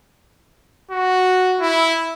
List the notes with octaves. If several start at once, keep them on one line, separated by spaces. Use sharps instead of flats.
F#4
E4